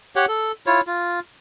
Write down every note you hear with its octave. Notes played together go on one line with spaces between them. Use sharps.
G4 C#5 F#5
A4
E4 F4 C#5
F4